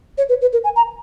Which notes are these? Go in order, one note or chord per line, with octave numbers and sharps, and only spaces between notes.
C#5
B4
B4
A#4
G#5
A#5